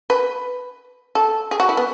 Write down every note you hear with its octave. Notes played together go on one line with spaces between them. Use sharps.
B4
A4
G#4
F#4
E4
B3